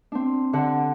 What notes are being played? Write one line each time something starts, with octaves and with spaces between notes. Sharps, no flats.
C4 D4
D3 F#5